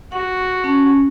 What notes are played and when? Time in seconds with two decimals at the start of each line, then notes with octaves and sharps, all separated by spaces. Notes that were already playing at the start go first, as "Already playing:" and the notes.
0.12 F#4 F#5
0.64 C#4 A5